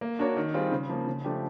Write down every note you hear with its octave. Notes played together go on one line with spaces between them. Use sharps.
A#3
D4 F#4 A#4 C#5
D#3
G3 C4 F4 G#4
C#3
F3 A#3
C#3
F3 A3 D4 G4